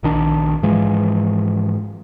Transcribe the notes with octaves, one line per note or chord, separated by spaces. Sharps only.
A#1 D#3 D4
G#2 E3 F3 G#3